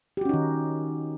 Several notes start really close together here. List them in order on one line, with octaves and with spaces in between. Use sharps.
G4 F#4 C#4 D#4 D#3